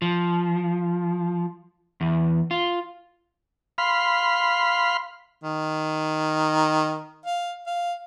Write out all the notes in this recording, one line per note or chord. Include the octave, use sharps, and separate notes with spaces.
F3
E2
F4
F5 B5 C6 F6
D#3
F5
F5